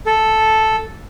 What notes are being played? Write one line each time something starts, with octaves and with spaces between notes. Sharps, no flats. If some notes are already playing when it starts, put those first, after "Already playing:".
A4